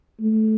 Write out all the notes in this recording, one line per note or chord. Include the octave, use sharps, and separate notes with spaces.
A3